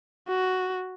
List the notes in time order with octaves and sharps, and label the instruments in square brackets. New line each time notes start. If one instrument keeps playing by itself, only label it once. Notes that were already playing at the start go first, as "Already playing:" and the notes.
[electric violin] F#4